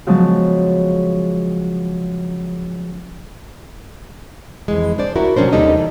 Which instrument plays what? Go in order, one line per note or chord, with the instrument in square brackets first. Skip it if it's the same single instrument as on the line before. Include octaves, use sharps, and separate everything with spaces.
[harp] C#3 F3 F#3 G#3 B3 A5
[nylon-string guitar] F2 E3 G#3
D4 C5 D5
E4 F#4 A#4
C3 F#3 A#3 C#4 D4 C5
D#2 D#3 G3 D#4 A4 D#5
E3